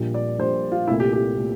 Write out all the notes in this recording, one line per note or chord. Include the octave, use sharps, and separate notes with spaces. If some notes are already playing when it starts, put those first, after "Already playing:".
Already playing: A#1 A#2 G3
D5
A#1 A#2 G3 C5
F4
C2 A#2 A3 E4
G4
G4
A#2 A3